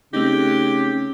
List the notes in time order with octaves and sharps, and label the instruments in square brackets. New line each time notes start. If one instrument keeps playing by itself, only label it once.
[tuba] C#3 [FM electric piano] A3 C4 D#4 [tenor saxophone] G4